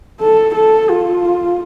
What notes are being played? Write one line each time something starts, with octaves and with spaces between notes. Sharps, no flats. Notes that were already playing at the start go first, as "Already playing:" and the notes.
A4
A4
F4